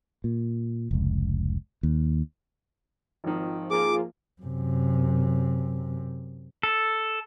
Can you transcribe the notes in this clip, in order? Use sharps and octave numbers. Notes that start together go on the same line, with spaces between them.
A#2
F1 C#2
D#2
G#1 D#3 F3
F3 A#3 F4 G#4 D6
F#2 C3
A4